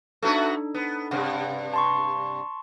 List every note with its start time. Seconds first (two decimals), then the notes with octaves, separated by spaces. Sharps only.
0.23 A3 B3 D4 D#4 F#4 A4
0.74 B3
1.11 G2 C3 F#5
1.74 A5 C6 C#6